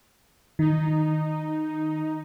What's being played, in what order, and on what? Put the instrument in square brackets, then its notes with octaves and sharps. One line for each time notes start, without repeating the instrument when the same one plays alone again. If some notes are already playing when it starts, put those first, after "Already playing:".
[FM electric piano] D#3 [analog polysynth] D#4